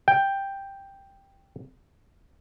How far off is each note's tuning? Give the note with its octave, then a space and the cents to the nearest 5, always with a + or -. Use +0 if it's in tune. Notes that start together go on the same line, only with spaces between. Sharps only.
G5 +5